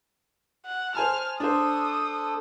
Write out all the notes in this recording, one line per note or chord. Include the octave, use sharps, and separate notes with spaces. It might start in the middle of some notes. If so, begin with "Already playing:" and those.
F#5
C5 G#5 A5 F6
D4 A4 C5 D#6